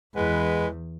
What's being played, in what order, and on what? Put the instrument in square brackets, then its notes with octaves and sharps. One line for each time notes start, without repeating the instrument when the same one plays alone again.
[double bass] E2 [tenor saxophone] G#3 [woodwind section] B3 E4 B4